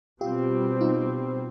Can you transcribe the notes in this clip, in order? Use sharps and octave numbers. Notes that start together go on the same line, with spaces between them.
B2 G3 C4 F4 G4
D#4 F4